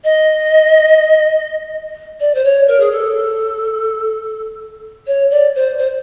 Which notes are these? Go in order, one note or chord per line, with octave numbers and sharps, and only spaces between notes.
D#5
D5
C5
C#5
A#4
G#4
A4
C#5
D5
C5
C5